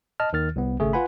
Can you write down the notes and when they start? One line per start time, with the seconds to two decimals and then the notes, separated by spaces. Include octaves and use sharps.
0.20 D#5 A5 F6
0.33 D#2 D#3 F6 A6
0.56 C2 B3
0.80 G#1 C#3 A3 G#4
0.93 F4 B4 F#5 G#5 B5